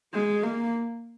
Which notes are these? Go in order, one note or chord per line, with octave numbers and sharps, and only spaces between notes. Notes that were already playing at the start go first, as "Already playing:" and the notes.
G#3
A#3